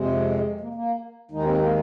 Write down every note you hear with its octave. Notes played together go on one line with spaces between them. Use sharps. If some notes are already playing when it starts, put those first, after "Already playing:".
Already playing: F2 C3 G#3
A#3
A#3
D#2 D#3 G#3 D#4
C4
A#3